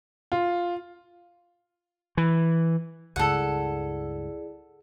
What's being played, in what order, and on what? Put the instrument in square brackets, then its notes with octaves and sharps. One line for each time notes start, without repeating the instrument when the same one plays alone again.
[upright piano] F4
[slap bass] E3
[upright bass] C#2 G2 [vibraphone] E4 G#4 D5 [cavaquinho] A4 F#5